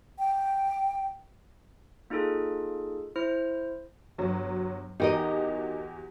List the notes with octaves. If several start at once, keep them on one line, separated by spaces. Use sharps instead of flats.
G5
A#3 D#4 F4 G#4 A4
E4 C5 F6
G1 F#3
E2 D#4 F#4 G4 A#4 D#5